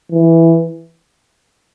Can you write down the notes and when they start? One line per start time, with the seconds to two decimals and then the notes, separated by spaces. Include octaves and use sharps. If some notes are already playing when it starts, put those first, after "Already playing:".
0.11 E3